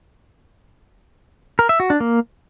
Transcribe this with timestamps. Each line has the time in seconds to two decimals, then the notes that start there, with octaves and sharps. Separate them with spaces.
1.59 A#4
1.69 E5
1.80 F#4
1.90 D4
2.00 A#3